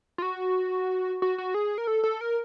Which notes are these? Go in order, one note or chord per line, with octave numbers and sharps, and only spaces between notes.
F4
F#4
F#4
F#4
G#4
A#4
A4
A4
A#4